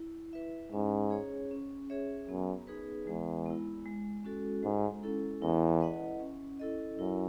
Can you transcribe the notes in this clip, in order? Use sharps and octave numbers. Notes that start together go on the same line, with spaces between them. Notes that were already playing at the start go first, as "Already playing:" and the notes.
Already playing: E4
B4 E5
G#2 C#4
G#4 C#5
C#4
G#4 C#5 E5
F#2 B3
D#4 G#4 B4
E2 G#3
B3 E4
G#3
C#4 F#4 A4
G#2 G#3
C#4 E4 A4
E2 E4
B4 D#5 F#5
C#4
E4 A4 D#5
F#2 E4